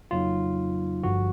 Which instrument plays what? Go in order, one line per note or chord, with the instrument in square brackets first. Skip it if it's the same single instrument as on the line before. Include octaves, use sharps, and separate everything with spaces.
[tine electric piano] F2 C#3 F#3 A#3 D#4 F4
G1 G2 D3 F3 F#4